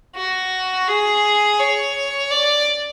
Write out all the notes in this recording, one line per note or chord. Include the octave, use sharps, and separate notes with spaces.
F#4
G#4
C#5
D5